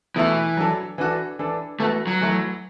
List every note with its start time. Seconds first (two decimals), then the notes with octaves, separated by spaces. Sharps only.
0.16 B2 E3 A3 E4
0.57 F#3 D4 A4
0.98 E3 D4 F#4 A4
1.39 E3 D4 A4
1.80 E3 A3 B3 F#4
2.07 F#3
2.21 E3 A3 E4 B4